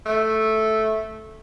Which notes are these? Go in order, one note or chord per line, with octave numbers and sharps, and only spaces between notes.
A3